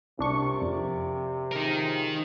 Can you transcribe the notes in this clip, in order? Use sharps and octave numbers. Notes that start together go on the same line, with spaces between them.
C2 C3 D4 F4 A#4 D5 C#6
F2
C#3 F3 G#3 D#4 A#4